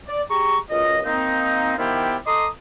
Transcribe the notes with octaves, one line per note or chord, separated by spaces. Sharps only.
D5
G4 G#4 A#5 C#6
C#2 F#2 F4 D#5
A#3 C4 D#4
D#3 F3 B3 E4 F4 G4
A4 D#5 A#5 C6 D6 D#6